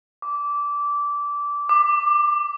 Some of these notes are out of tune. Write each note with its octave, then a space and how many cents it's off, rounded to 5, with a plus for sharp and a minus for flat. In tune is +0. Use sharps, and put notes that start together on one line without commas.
D6 -15
D6 +20